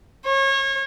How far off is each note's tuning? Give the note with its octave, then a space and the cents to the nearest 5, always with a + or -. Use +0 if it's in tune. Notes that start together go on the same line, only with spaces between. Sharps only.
C#5 -30